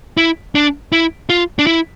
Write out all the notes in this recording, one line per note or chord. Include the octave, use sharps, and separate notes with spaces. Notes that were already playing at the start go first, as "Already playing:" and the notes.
E4
D4
E4
F4
D4
E4